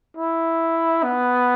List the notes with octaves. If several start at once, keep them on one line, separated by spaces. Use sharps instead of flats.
E4
B3